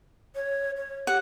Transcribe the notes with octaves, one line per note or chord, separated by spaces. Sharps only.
C#5
C#5
G4 F#5